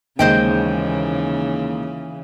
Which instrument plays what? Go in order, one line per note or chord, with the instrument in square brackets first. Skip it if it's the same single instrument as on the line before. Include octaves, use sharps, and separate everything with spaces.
[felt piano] D#2 G#3 [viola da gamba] C#3 E3 [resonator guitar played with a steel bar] C5 D#5 G5